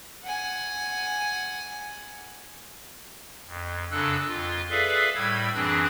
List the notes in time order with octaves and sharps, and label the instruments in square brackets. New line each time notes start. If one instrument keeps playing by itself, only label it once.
[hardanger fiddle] F#5 G#5
[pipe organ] F2
F#2 C#3 D4 A4 E6 F#6
F2 F4
G#4 A4 B4 D5 E5 F5
A2 G3 E6 G#6
F#2 E3 C4 D4 G#4 F#6